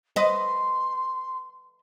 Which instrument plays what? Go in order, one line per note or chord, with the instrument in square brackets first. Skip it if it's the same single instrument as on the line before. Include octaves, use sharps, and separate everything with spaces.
[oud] B4 D#5 [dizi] C6